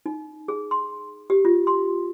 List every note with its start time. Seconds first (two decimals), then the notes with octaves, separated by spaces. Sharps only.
0.06 D#4
0.48 G#4
0.71 C6
1.30 G4
1.45 F4
1.67 C6